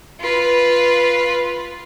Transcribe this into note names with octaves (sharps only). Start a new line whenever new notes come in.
F4 B4